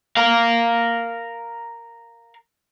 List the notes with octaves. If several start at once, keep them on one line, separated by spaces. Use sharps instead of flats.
A#4 F5